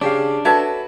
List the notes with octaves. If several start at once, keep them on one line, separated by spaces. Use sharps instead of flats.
C#3 C#4 D4 G4 F5
F#4 A4 B4 C#5 E5 A5